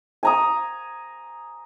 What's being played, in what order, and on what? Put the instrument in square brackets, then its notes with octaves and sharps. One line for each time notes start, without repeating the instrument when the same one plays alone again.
[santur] G#5 A#5 D#6